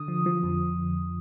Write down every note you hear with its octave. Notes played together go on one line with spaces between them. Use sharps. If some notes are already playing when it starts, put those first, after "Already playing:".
Already playing: D3 D#6
F3
F3
F2